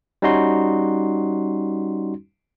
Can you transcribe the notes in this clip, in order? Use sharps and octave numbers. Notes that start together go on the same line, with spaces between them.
G3 C#4 D#4 F#4 C6